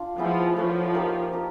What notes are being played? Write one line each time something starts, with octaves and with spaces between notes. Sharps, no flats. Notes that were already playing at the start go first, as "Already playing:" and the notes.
Already playing: D4 F4
F3 B3 E4 G#4
F3 E4 A4 C#5 E5
A#3 D#4 G4 A#4
D4 G4 A#4